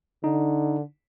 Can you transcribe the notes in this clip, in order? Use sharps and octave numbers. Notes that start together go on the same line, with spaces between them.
D3 D#4